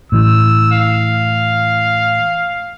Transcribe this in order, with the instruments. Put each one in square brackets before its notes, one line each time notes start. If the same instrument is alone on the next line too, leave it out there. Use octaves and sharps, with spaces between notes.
[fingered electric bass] A2 E3 [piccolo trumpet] E6
[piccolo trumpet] F5